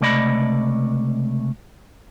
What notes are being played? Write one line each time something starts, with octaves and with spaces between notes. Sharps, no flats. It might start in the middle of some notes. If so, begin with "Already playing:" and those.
C#2 C3 A3 D5 D#5 B5